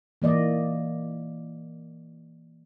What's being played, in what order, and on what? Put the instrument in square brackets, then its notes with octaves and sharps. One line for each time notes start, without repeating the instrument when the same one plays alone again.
[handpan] E3 A#3 D5 D#5